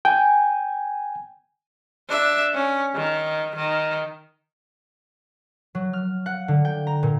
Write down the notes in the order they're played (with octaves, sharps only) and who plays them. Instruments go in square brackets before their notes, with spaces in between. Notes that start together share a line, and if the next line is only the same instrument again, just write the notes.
[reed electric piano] G5 [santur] G#5
[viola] D4 E5
C#4
D#3
D#3
[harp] F#3
F6
F#5
D3
G5
A#5
A#2